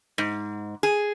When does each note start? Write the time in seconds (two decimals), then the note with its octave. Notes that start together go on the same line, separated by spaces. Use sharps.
0.18 G#2
0.83 G#4